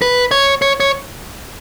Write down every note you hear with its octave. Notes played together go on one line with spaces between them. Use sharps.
B4
C#5
C#5
C#5